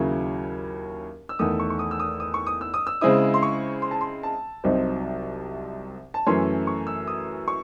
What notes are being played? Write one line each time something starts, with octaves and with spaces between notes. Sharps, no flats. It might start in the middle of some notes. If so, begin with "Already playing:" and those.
Already playing: D#2 C#3 F#3 C#4 E4
E6
E2 D#3 A3 D#6
C#6
C#6
D#6
E6
D#6
D#6
C#6
D#6
E6
D#6
E6
C#3 G#3 C4 E4 D#6
C6
C#6
C6
A5
C6
A5
C2 C3 F#3 C4 D#4
A5
F#2 E3 A3 C#4 C6
C#6
E6
D#6
C#6